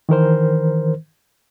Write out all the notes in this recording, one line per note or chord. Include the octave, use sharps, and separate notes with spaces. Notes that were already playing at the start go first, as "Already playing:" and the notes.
D#3 E3 A#4 C5